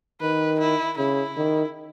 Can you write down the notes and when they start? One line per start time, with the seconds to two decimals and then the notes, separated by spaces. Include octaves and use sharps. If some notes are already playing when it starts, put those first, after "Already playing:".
0.21 D#3 B4
0.59 E4
0.98 C#3 E4
1.36 D#3